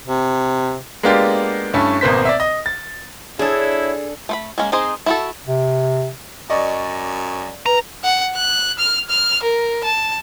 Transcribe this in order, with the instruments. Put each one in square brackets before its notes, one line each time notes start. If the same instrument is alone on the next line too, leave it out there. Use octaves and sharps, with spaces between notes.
[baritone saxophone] C3
[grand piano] G#3 A#3 B3 D4 F4 G4
G2 A3 C#4 E4
G#1 B2 A#3 C5 B6
D5 E5
D#5
A6
[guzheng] D4 A4 [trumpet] E4 [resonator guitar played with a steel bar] G#4 [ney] C#5
[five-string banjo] A3 C5 B5
G#3 A#3 C#4
C4 D#4 G#4 C5 D#5
E4 F#4 A4
[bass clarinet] C3
[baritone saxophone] F#2 [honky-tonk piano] D5 D#5 C#6
[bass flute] B4 [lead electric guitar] A#5
[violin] F#5
F#6
F6
F6
A#4
A5